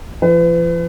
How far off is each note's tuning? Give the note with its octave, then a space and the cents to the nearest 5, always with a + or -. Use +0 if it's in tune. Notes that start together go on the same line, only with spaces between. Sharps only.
F3 -40 B4 +35